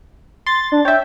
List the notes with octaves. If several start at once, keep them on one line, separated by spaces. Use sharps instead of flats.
C6 A6
D4
C#5 E5 G5